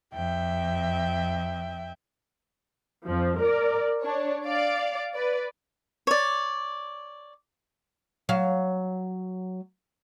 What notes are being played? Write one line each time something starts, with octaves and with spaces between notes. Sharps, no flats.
F2 E5 G5
F2 F3
A#4 D5
D4 C#5
D5 F5 D6
B4 D5
C#5 D5
F#3 F5